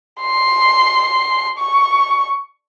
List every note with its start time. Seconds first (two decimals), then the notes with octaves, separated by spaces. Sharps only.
0.21 C6
1.60 C#6